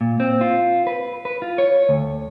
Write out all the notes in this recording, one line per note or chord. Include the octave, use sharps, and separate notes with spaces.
A#2
C4
F4
B4
B4
F4
C#5
D2